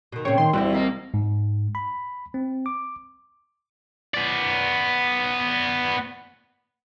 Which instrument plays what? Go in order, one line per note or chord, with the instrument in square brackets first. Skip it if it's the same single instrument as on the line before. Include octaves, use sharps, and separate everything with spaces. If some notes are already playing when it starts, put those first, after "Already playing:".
[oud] B2 D#3
[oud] A#2 C4 [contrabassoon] C#3 [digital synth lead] C#5
[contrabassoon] D#3 [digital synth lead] C6
[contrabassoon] C2 [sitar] G2 E3 [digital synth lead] C4 [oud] F#4 D5 E5
[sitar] B2 A#3
[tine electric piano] G#2
B5
C4
D6
[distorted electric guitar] B3 D5